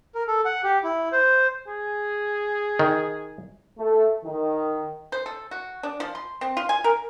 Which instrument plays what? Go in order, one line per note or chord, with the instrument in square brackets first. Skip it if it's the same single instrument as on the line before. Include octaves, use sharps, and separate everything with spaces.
[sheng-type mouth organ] A#4
A4
F#5
G4
E4
C5
[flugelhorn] G#4
[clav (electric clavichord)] D#3
[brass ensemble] A3
D#3
[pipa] C5
A4
F#4
D4
F3
C6
C4
F4
G#5
A#4